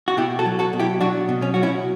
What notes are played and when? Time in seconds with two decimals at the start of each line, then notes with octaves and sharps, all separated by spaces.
0.08 F#4
0.17 B2 E4 G4
0.39 F#4 A4
0.45 F#3
0.59 F#4 A4
0.73 B2
0.79 E4 G4
1.00 F#3 D4 F#4
1.29 B2
1.42 C#4
1.54 F#3 F#4
1.63 C#4 E4